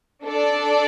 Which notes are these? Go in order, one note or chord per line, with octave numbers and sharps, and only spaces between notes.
D4 A4 D5